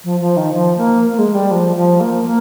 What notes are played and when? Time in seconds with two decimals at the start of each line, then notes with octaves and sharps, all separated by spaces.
0.04 F3
0.20 F3
0.36 D#3
0.53 F3
0.77 A#3
1.12 A#3
1.18 G#3
1.34 G3
1.51 F3
1.75 F3
2.00 A#3
2.25 A#3